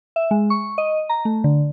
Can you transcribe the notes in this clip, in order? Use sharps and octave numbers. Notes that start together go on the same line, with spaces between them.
E5
G#3
C#6
D#5
A#5
A3
D3